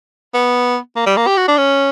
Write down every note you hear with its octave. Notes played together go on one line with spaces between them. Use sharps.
B3
A#3
G3
A#3
G4
F#4
D4
C#4